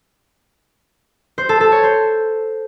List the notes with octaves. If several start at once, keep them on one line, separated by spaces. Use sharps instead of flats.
C5
A4
A4
C#5
C5